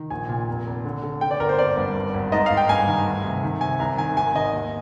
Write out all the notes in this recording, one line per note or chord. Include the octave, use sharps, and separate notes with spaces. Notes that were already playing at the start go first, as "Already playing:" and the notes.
Already playing: D#3
A#1 G#5
A#2
F1
F1
D3
D3
D3 G5
D5
G1 A#4
C5
G#1 D5
G2
G#1
G#1
G#2 D#5
G#2 F5
G5
G2 G#5
D#3
D2
C3
D#3
C3 G#5
C2 A#5
D#3 G#5
G#1 G#5
D#3 D#5
D#2